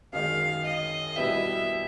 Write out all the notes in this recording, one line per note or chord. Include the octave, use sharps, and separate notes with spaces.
F#2 D#3 G#3 F5
D#5
B2 G3 B3 E4 G4 E5